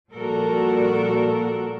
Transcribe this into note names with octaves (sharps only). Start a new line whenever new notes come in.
A#2 F3 G3 F#4 A4 A#4